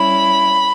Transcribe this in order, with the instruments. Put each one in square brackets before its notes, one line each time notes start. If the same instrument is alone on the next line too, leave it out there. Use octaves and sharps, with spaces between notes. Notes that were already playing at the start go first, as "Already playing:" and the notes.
Already playing: [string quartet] G3 C#4 E4 B5